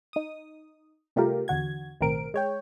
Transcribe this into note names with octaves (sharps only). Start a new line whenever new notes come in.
D#4 D#6
C3 G3 A3 F4 G4 A#4
E2 D3 F#4 G#6
B1 A2 D#3 C4 A#4 D7
G#3 C#5 G5